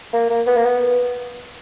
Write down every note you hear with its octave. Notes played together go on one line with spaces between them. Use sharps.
A#3
A#3
B3
A#3
B3